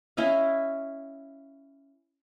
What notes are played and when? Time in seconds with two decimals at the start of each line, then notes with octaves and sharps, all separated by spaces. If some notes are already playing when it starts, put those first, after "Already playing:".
0.17 C#4 E4 D#5 F5